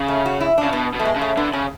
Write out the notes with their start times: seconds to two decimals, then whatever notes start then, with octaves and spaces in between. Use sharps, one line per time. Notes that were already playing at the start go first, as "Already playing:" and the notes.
Already playing: C#3
0.08 A3
0.26 F#4
0.41 E4
0.58 D4
0.63 C#3
0.73 B2 B3
0.95 B2 A3
1.05 G#3
1.16 C#3
1.21 A3
1.37 D3 B3
1.53 C#3 C#4